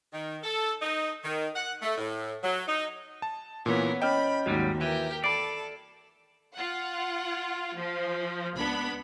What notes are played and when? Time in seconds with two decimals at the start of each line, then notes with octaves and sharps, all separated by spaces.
0.13 D#3
0.44 A4
0.82 D#4
1.24 D#3
1.56 F#5
1.82 A3
1.98 A2
2.43 F#3
2.68 D#4
3.22 A5
3.66 A#2 E3 B3 C#4 A#4
4.02 C#4 C#5 D#5 G5 B5 F6
4.46 D#2 G#2 F#3 G3 F#4
4.81 E3 G4 A#4
5.24 A4 D5 B5 C7
6.54 F4 F#5
7.76 F3
8.57 C#2 B3 D4 B5